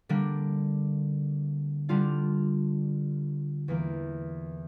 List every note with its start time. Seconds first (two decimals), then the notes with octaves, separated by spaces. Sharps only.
0.09 D3 G3 A#3 D4
1.89 D3 G3 D4 F4
3.68 E2 E3 A#3